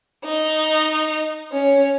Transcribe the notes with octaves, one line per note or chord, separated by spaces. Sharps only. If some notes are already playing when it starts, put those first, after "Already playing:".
D#4
C#4